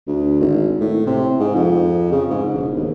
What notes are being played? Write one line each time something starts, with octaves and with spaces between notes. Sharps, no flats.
D2
G#1
A2
C3
G#2
F2
C#3
G#2
E1
D#2